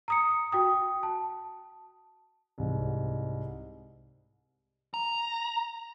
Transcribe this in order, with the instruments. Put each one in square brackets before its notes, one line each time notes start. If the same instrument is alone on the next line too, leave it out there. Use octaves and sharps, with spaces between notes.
[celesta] A#5 D#6 C#7
F#4 G5 D#6
A5
[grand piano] C2 G#2
[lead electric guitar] A#5